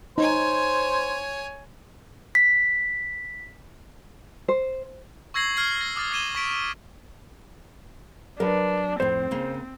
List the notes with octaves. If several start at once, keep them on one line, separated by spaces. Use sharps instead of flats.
D#4 C5 C#5 G#5
B6
C5
C#6 E6 G#6 A#6 C7 F#7
F6 G#6 C7
A#6
D6 D#6 F6 A6
D6 G#6 C7 D#7 E7 G7
C#6 B6 D7
F#3 D4 A#4 B4
F2 A2 C4 C5
C#3 A#3